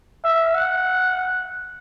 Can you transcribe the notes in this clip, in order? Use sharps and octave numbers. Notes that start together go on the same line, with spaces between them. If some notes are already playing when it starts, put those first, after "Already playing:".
E5
F#5